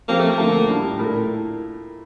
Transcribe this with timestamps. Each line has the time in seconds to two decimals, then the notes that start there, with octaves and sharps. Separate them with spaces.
0.08 F3 A#3 C4 G4
0.19 A3
0.30 A#3
0.38 D3 F3 A3
0.68 A2 G3 D4
0.99 A#2 A3 E4 A#4